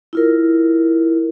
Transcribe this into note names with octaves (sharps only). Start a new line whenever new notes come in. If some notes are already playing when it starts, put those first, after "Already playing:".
E4 F4 A#4